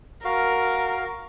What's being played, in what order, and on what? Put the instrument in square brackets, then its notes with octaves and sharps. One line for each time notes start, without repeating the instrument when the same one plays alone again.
[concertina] F#4 F5 [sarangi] A#4